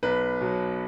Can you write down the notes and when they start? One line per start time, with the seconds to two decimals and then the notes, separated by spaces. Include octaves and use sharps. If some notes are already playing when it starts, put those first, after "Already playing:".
0.03 B1 B4
0.41 B2 F#3